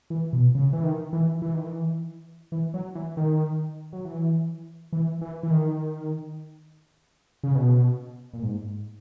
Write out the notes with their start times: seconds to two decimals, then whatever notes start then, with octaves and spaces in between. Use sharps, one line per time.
0.10 E3
0.33 B2
0.55 C#3
0.73 E3
0.83 D#3
1.13 E3
1.42 E3
1.54 D#3
1.65 E3
2.52 E3
2.74 F#3
2.95 E3
3.17 D#3
3.93 F#3
4.05 E3
4.92 E3
5.21 E3
5.43 E3
5.51 D#3
7.43 C#3
7.55 B2
8.34 A#2
8.43 G#2